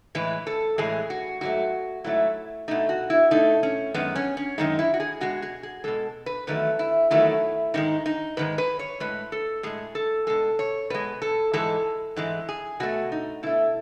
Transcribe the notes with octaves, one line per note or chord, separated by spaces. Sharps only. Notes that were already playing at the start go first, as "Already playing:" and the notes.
A2 E3 G#3 B4
A4
A2 E3 G#3 G#4
F#4
G#2 F#3 A3 F#4
G#2 F#3 A3 E4
B2 A3 D#4
F#4
E4
B2 A3 D#4
C#4
F#2 D#3 G#3 B3
C#4
C#4
F#2 D#3 G#3 D#4
E4
F#4
G#4
B2 G#3 F#4
G#4
G#4
B2 G#3 A4
B4
E2 D#3 F#3 A3 B4
E4
E2 D#3 F#3 A3 E4
G#2 D#3 G#3 D#4
D#4
G#2 D#3 G#3 B4
B4
C#5
A2 G#3 B4
A4
A2 G#3 G#4
A4
B2 G#3 A4
C#5
B2 G#3 B4
A4
G#2 E3 G#3 A4
G#2 E3 G#3
G#4
B2 A3 F#4
D#4
B2 A3 E4